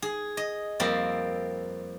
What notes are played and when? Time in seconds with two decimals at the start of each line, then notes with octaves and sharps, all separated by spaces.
0.02 G#4
0.37 D#5
0.80 F2 G3 A#3 C4